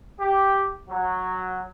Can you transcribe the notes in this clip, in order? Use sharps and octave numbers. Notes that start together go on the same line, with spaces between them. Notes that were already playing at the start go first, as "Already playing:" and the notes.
G4
F#3